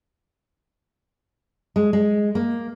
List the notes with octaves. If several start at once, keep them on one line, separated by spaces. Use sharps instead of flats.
G#3
G#3
A#3